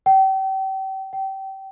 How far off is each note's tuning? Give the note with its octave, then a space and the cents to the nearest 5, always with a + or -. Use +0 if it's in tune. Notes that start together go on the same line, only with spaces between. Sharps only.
G5 -35
G5 -25